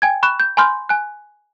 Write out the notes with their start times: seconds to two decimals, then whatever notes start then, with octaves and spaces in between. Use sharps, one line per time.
0.02 G5 G#5 G#6
0.23 B5 C#6 F#6 E7
0.40 G6
0.57 G#5 B5 C6 F6 G6
0.89 G#5 F#6